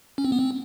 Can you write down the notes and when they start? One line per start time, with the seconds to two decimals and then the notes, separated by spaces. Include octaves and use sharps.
0.18 C#4
0.25 C4
0.32 B3
0.39 C4